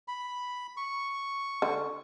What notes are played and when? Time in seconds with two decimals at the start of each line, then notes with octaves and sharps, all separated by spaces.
0.08 B5
0.77 C#6
1.62 D3